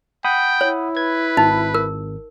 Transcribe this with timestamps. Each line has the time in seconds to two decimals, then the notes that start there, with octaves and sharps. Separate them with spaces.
0.25 F#5 G5 B5 D#6
0.61 E4 C#5
0.97 B4 G#6
1.37 G#1 D#4
1.75 A#4